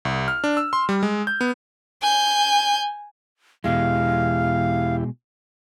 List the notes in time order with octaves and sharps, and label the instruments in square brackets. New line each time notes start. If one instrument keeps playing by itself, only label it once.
[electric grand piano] C2
F6
D4
E6
C6
G3
G#3
G6
B3
[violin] G#5 G6
[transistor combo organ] E2 E4 G4 [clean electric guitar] B2 G#3 [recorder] F5